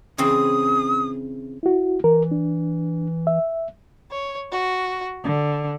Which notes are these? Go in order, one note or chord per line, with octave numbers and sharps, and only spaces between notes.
C#3 E3 C4 D#6
E4 F#4
E3 A#4
D4
E5
C#5
F#4
D3